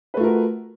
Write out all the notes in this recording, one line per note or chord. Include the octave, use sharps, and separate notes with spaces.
A3 F4 F#4 A#4 B4